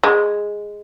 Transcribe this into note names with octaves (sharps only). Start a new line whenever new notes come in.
G#3